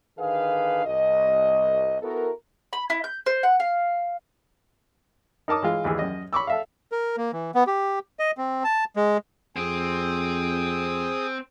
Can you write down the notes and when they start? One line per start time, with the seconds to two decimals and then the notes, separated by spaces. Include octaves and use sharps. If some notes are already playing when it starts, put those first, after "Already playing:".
0.19 D3 D#3 G#4 B4 F5
0.86 C2 D#5
2.02 B3 E4 F#4 A4 A#4
2.73 B5
2.90 E4
3.04 G6
3.26 C5
3.43 F#5
3.60 F5
5.48 D#4 A#4 A5 D6 D#6
5.63 E3 G#3 F4
5.85 D#2 E3 G#4
5.99 F#2 D#5
6.33 B5 C#6 D6 E6
6.47 A4 E5 F5
6.92 A#4
7.17 A#3
7.33 E3
7.55 B3
7.67 G4
8.19 D#5
8.38 C4
8.64 A5
8.96 G#3
9.56 F2 C4 G#4 D#6